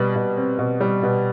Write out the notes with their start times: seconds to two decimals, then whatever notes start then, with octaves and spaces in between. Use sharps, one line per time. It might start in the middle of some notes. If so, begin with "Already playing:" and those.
Already playing: B2 G3
0.16 B2
0.37 C4
0.59 B2
0.80 G3
1.03 B2